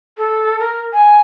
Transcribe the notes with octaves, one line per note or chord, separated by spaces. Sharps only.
A4
A#4
G#5